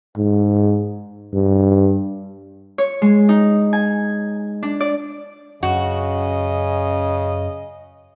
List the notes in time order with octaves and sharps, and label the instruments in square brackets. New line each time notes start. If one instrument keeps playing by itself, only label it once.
[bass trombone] G#2
G2
[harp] C#5
G#3
D#4
G#5
D4
D5
[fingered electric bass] F#2 [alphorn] C#3 [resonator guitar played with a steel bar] F#4 [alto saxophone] D#5